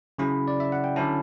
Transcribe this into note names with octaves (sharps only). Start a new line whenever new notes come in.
C#3 F#3 C#4 E4 B5
D5
E5
F#5
G5
D3 F#3 C#4 E4 A5